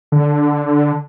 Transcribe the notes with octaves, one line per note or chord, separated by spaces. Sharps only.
D3